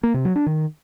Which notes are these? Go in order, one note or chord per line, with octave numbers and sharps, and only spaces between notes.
A#3
C3
F#3
D4
D#3